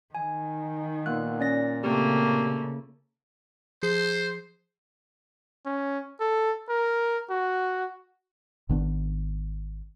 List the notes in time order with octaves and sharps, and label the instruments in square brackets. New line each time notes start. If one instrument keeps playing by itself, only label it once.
[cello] D#3 [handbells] G#5
[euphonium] A#2 [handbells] A#3 B3 F#6
[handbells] C#4 D5 A#6
[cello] C#3 [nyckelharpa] A3 A#3 [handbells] C4 G4
[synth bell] F3 G#4 C7 [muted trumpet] C5
[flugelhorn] C#4
A4
A#4
F#4
[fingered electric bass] G#1 D#3 B3 D4